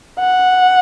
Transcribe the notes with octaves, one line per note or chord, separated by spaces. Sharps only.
F#5